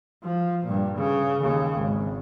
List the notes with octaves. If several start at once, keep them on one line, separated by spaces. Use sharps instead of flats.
F3
G2 A#2
C#3
D#2 C#3
G#1